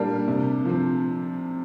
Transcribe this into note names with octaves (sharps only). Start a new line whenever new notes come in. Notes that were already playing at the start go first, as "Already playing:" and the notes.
Already playing: A#2 G3 A#3 D4
C3
F3 C4